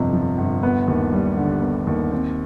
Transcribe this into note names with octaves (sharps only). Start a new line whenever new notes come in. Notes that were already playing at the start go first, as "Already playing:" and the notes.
Already playing: G1 F2 C3
F3
G1
B3
D#2
G3
D3
B3
D#2
C4